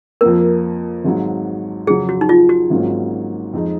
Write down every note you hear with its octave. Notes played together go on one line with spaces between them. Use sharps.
F2 F3 A#3 A#4
G#1 G#2 F#3
F2 C#3 F#3 G#4
F#4
D#4
F4
F#4
G#1 G#2 F#3 A#3 C#4
F2 F3 G#3 D#4